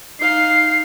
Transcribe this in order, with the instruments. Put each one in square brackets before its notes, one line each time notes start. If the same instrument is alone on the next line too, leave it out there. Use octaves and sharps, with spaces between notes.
[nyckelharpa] D#4 F5 [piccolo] C7